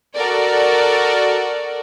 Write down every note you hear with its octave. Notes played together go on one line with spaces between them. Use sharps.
F#4 A4 A#4 D5